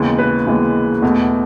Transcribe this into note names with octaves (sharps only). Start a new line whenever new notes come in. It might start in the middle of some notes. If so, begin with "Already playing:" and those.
Already playing: D#2 C#3 E3 G#3 B3
B4
D#2 C#3 E3 G#3 B3
E2 B2 A3